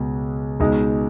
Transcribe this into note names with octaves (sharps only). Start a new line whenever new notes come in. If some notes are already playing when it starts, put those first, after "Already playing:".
Already playing: C#2 B2 G#3
C#2 B2 G#3 D#4